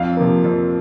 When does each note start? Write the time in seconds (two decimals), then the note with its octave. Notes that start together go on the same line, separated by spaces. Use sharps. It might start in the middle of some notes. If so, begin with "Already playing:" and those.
Already playing: F2 F5
0.17 C3 F3 A#3
0.44 F2